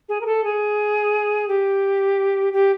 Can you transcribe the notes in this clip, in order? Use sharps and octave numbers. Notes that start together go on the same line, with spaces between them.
G#4
A#4
A4
G#4
G4
G4